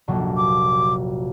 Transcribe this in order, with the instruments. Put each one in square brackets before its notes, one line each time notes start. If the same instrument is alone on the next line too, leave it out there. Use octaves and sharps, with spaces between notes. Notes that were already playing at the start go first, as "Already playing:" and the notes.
[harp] F1 A#1 F#3
[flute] D6